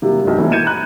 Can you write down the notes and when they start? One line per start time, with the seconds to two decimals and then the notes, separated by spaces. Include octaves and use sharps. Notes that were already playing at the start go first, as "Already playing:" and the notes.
0.02 C3 F#3 G3 A#3
0.24 B1 G2
0.38 B2 E3 F#3 A3
0.52 G6 G#6 C#7 D#7 E7
0.64 A#5 B5 F#6